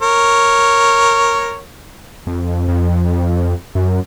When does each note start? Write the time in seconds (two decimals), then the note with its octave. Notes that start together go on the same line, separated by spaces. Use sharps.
0.02 A#4 C#5
2.27 F2
2.68 F2
3.75 F#2